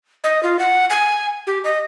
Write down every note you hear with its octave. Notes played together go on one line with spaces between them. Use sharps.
D#5
F4
F#5
G#5
G4
D#5